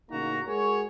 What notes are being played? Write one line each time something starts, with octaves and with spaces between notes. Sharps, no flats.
A1 C#3 A#3 D#4 F#4 A#5
G#3 F#4 G#4 A#4 C#5